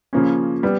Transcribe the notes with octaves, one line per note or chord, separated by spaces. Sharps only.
C#3 F3 A#3 C#4
G3 B3